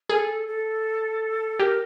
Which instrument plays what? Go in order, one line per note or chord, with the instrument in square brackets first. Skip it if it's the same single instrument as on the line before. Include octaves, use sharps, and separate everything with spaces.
[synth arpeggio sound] G#4 [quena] A#4
[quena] A4
A4
[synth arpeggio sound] G4 [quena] A#4